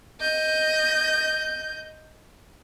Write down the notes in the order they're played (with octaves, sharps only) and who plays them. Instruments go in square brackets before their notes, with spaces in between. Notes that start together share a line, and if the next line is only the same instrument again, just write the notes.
[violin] D#5 G6